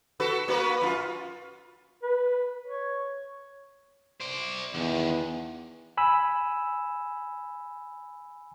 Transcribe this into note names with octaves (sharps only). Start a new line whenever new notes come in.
F#4 A4 B4
A#3 F#4 B4
F#2 F4
B4
C#5
C5 D5
E2 D3 D#3
G#5 B5 E6